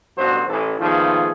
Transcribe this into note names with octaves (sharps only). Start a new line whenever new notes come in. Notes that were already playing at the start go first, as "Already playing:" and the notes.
A1 G2 B2 F#3 F#4 C5
A1 E3 A4
A#2 D#3 F3 A3 B3 G#4